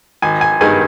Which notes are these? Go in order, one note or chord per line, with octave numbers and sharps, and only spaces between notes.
G#1 G#5
G#5
G2 D#3 G#3 G#5